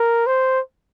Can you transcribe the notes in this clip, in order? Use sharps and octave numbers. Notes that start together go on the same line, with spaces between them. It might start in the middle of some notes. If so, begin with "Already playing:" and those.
Already playing: A#4
C5